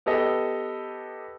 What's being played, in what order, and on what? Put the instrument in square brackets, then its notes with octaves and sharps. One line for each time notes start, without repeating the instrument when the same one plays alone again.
[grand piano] B3 G4 A4 D#5